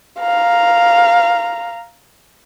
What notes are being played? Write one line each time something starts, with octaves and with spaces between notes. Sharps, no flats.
F5 A#5